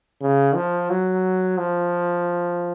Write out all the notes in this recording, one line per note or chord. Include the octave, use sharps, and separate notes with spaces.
C#3
F3
F#3
F3